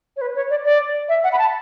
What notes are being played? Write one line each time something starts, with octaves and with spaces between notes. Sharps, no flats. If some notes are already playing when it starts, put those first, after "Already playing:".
C#5
B4
C#5
D5
D5
E5
F#5
B5
A5